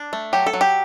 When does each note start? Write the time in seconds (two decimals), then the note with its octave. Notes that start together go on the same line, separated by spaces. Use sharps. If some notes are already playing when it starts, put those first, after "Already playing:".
Already playing: D4
0.13 A3
0.33 F#3 G4
0.46 A4
0.53 F#3
0.61 G4